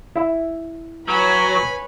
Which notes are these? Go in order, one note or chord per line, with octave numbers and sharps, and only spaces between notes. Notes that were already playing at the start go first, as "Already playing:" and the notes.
E4 E5
F#3 B4 C#5 G#5 B5